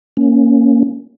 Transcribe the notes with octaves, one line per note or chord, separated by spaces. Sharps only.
A#3 C#4